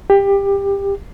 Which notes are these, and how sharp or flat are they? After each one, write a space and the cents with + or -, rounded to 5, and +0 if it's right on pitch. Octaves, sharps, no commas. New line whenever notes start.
G4 +20